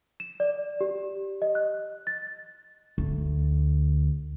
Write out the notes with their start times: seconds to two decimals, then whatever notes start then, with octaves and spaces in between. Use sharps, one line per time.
0.20 E7
0.40 D5
0.81 G4
1.42 D#5
1.55 F#6
2.07 A6
2.98 D2